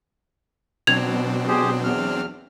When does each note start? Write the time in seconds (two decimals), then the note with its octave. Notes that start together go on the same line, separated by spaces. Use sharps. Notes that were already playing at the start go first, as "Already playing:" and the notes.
0.87 B2 F#3 C4 D4 G#6 F7
1.48 G4 G#4 C5
1.84 E2 F6